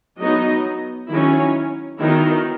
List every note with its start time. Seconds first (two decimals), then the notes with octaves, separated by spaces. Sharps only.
0.19 F#3 B3 D#4 D#5
1.08 D#3 F#3 C#4 E4
1.98 D#3 F#3 B3 D#4 E4